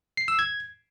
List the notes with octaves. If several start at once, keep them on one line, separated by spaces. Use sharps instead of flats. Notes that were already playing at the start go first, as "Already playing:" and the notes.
C7
E6
G#6